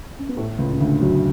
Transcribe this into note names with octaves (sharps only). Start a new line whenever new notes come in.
C#4
B3
A2 A3
C#2 C#3
C#3
D2 D3
F#2 F#3